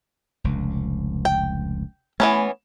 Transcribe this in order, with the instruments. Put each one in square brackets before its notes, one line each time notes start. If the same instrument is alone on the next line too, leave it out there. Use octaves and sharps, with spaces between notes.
[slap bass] F1 C#2
[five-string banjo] G5
[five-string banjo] E3 B3 C#4 [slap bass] A3